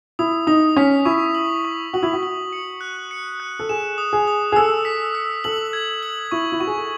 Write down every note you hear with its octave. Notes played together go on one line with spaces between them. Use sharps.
E4 D#6
D#4 D#6
C#4 B6
E4 C#6
F#7
C#6
F#4 F#7
E4
F#4
F#7
C#7
F#6
C#7
F#6
A4
G#4 E7
D#6
G#4
D#6
G#4
A4 E6
B6
E6
A4 F#7
G#6
F#7
E4 C#6
E4
F#4 C#6
G#4
A4